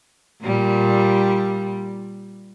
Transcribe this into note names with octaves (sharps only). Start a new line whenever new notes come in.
A#2 G3